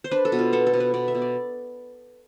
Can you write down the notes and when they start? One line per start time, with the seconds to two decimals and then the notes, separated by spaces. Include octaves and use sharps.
0.04 C5
0.11 D4 B4
0.25 A4
0.32 B2
0.39 F4
0.53 B3 A4
0.67 A4
0.74 B2
0.80 B4
0.94 B2 D5
1.08 E5
1.15 B2
1.22 D5